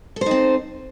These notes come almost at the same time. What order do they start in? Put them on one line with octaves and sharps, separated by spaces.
A4 C5 D#4 C4